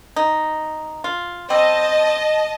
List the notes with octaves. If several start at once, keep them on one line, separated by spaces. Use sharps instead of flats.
D#4
F4
G3 C4 D#5 A5